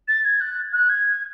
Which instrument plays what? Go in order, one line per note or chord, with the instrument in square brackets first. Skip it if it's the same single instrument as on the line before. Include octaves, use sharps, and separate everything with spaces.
[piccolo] A6
G#6
F#6
F#6
G#6